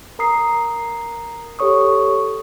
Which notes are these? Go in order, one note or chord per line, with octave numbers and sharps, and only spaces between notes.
A#4 A#5 D#6 C7
G4 A4 C#5 C#6 D#6